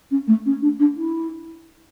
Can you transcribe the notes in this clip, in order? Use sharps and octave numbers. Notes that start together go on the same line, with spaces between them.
C#4
A3
C#4
D4
D4
E4